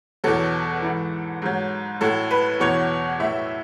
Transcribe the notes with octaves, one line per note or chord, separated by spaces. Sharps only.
E2 B2 F#3 A4
G#2 E3
G#2 F#3
A2 F#3 A4
B4
E2 B2 F#3 C#5
A2 F#3 E5